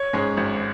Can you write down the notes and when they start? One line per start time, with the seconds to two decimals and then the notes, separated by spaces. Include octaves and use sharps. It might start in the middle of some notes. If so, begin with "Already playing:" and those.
Already playing: C#5
0.13 G#2 G#3 C#4
0.37 G#1